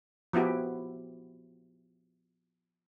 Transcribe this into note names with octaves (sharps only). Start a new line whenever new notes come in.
F3 B3 E4 F#4 G4